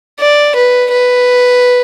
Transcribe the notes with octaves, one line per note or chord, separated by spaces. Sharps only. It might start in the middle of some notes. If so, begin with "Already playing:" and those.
D5
B4
B4